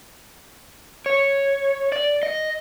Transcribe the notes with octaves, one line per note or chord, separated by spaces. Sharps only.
C#5
D5
D#5